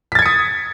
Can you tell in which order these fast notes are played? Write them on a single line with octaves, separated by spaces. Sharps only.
B6 A6 G#6 C#7 D#6